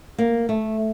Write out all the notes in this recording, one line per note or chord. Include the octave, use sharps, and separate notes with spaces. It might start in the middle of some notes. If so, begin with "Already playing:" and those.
A#3
A3